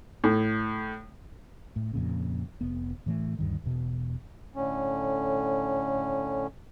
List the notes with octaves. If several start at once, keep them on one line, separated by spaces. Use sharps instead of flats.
A2
A2
F2 A#2 C#3
F1 B3
A2 E3 A3
D2 G2 D#3
E1 B2
A2 D3 C#4